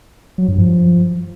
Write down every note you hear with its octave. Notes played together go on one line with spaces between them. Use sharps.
F#3
G2
F3